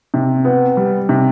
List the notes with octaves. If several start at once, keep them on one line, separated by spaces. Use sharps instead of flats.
C3
B3
G3
C3